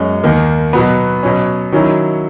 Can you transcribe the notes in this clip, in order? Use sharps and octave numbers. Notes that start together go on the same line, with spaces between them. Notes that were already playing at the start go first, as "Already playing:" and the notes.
Already playing: F#2 G#3 C#4
D#2 D#3 A#3
B2 F#3 B3
B2 F#3 C#4
D#3 F#3 C#4 E4